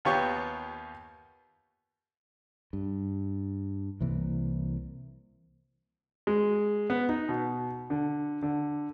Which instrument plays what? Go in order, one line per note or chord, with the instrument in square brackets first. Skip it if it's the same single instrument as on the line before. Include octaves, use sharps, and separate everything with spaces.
[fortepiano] D#2 B3 F4 G4 C#5 C#6
[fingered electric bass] G2
C2 C3 E3 A#3
[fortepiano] G#3
B3
D#4
B2
D3
D3